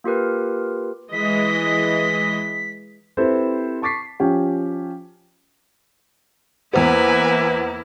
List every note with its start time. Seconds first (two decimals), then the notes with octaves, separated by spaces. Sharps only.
0.04 A#3 F4 G4 A#4 B4
1.13 E3 G#3 D#5 B6
3.17 C4 E4 G4 A4 B4 C5
3.82 A5 C#6 D6 A6 B6 C7
4.20 F3 C#4 G4
6.73 E2 A#3 B3 E4 B4 C5 G#5